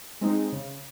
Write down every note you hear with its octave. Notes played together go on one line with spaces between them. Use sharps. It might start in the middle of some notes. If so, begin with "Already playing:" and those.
G#3 C4 D#4
C#3